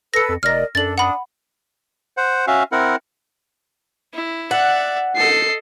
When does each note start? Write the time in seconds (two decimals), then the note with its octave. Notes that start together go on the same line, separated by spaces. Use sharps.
0.14 A4 B4 E6 A#6 C#7
0.29 F2
0.43 F1 A#4 D5 D#5 F6 A#6
0.75 F#2 D4 A4 A6 F#7
0.98 D4 F#5 B5 D#6
2.17 C5 F#5
2.47 C#4 F#4 E5 F5
2.72 C4 E4 A#4 F#5
4.14 E4
4.51 D5 E5 F#5
5.17 A4 D#5 C7